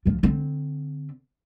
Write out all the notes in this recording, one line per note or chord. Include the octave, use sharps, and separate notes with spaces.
D2 F3
D3 C4